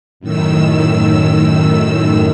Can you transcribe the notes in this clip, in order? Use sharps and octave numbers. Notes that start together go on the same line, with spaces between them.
F#2 A2 D#3 E6